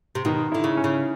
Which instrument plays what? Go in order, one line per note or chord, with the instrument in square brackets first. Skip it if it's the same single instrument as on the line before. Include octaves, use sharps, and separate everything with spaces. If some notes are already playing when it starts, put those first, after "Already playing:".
[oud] C3
[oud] B2 [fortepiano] D#3
[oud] D3 [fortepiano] E4
[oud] C#3
[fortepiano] C#4
[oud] C#3